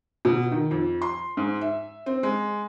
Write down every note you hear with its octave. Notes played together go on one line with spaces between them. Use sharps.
B2
D#3
F2
C6
G#2
E5
C4
G#3